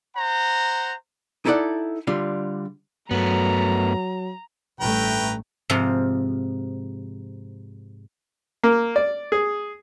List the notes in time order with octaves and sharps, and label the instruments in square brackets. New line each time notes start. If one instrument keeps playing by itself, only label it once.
[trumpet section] C5 F#5 A#5
[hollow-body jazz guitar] D#4 E4 A4 D5 F#5
D3 G3 D4 F4
[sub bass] G2 [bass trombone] F#3 [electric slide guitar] A3 B3 [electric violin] A#5
[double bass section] A1 G2 A3 [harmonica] B4 G5 A#5
[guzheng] G#2 C3 F3
[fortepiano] A#3
D5
G#4